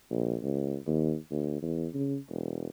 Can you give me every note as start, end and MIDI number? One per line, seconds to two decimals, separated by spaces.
0.10 0.36 34
0.42 0.77 37
0.86 1.15 39
1.31 1.59 38
1.62 1.87 40
1.94 2.17 49
2.29 2.68 28